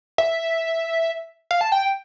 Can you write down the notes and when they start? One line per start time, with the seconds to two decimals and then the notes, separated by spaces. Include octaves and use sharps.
0.18 E5
1.51 F5
1.61 A5
1.72 G5